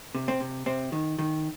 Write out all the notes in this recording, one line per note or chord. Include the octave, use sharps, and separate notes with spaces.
C3
C4
C3
C3 C4
D#3
D#3